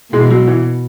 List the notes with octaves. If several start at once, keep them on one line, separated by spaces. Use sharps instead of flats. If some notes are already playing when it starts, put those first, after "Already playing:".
B2 E3 G#3
F#3
E3